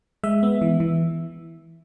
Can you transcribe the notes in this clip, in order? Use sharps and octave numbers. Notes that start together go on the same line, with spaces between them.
G#3 E5
B3
E3
E3